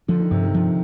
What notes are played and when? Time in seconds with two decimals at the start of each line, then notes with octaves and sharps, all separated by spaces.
0.08 D3 F3
0.20 D#3
0.31 G2 C3
0.43 D#3
0.54 F3